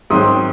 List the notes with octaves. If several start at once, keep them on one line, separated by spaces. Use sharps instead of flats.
G#2 D#3 F#3 C4 C6 D#6